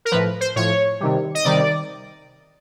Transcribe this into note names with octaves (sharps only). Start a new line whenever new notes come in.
A#4
A2 F3 B4
C5
A2 F3 C#5
C3 D#3 G3
D#5
C3 D#3 G3 D5